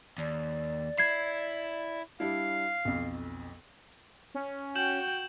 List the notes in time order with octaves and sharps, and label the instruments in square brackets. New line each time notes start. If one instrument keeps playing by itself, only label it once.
[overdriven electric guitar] D#2 [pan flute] D5
[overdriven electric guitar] E4 [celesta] G#6 C7
[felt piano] G3 D4 E4 [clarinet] F5
[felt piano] B1 F2
[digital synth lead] C#4
[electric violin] F#4 G5 [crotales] G6 E7 F#7